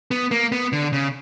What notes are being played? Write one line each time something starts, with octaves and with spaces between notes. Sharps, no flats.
B3
A#3
B3
D3
C#3